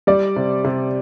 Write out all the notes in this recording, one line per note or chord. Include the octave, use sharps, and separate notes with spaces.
G3 D5
C3
C3